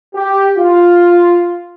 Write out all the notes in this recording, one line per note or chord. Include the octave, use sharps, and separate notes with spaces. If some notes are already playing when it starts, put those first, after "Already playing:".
G4
F4